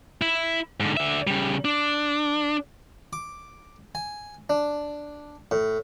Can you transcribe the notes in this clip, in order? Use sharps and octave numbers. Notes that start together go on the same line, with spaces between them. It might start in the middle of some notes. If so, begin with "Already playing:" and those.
E4
G#2 D3
D3 E5
C#3 G3
D4
D6
G#5
D4
A2